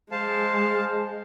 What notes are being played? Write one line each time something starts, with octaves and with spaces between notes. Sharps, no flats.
G#3 C5 F5 A5